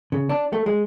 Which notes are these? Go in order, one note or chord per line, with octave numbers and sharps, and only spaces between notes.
C#3
D4
A3
G#3